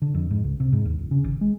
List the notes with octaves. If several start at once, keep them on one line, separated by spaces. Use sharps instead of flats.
D3
F2
G#2
C#2
C3
G#2
D#2
D1
C#3
G#1
G#3